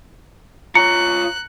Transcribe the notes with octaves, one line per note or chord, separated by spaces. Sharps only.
F4 C#5 A#5 F#6 C#7